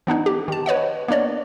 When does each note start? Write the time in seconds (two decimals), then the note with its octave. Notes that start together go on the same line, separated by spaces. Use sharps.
0.07 E3 B3 D4 D#4
0.26 G4
0.48 D#3 A5
0.66 B4 C#5 D#5 F#5
1.08 A#3 B3 D4 C#5 D5